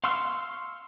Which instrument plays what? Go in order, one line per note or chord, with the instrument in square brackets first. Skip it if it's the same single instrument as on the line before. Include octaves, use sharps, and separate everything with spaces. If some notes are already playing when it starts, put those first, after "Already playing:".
[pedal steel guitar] F5 C6 C#6 E6 F6